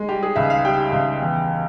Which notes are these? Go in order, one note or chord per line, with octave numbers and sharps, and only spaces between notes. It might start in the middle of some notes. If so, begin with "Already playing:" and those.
Already playing: G#3
G3 G4
G#4
C#2 E5
F5
G3 G5
C#2
E2